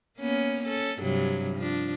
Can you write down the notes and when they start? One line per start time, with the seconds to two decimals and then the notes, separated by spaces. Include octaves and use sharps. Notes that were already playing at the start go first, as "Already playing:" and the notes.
0.18 A#3 B3 C#4
0.64 C#4 A4
1.01 G2 C3 F#3
1.58 F3 D4